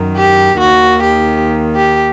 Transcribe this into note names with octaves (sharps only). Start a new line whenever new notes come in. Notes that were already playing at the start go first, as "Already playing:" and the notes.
Already playing: F#2 D#3
G4
D#2 D#3 F#4
G4
G4